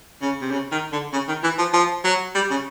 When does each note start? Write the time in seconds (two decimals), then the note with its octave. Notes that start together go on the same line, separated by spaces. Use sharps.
0.22 C#3
0.41 C3
0.52 C#3
0.72 D#3
0.93 D3
1.13 C#3
1.28 D#3
1.43 E3
1.58 F3
1.74 F3
2.04 F#3
2.35 G3
2.51 C#3